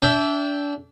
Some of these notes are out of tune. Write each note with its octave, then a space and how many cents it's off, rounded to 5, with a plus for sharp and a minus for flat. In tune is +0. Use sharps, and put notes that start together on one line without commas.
D4 -30 E5 +0 G5 +0